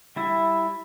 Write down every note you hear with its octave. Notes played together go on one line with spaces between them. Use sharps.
G3 E4 E5